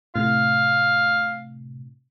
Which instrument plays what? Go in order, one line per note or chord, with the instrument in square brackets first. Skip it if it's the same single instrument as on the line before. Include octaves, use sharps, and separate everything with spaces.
[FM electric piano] A2 C3 [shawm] F5